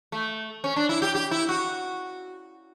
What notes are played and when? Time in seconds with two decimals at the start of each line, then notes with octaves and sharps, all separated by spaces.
0.12 A3
0.64 C#4
0.76 D4
0.89 E4
1.02 G4
1.15 G4
1.31 E4
1.49 F#4